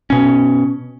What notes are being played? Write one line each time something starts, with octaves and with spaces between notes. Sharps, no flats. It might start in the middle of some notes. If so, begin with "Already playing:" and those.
B2 C#4